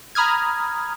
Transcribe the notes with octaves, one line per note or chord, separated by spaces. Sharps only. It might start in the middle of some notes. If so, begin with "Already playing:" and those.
A#5 B5 D#6 F6 G#6